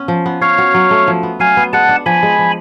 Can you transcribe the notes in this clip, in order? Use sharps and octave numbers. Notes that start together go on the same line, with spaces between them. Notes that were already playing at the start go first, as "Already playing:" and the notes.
Already playing: B3 C#4
F3
B3
C#4 C#5 F5
F#4
F#3
A3
F3
B3
F#3 F5 G#5
B3
G#3 F#5 A5
D4
F3 G#5 B5
G#3
F3